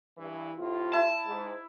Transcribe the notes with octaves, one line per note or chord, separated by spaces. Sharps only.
G2 E3
A2 C3 F4
E4 A5
G#2